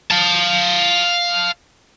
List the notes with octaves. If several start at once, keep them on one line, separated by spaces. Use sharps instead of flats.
F5 A5